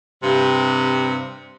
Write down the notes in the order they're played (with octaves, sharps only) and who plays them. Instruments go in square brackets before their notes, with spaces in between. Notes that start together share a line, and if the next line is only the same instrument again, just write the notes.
[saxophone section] G2 C3